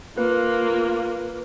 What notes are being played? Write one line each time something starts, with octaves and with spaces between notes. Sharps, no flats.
A#3 F4 B4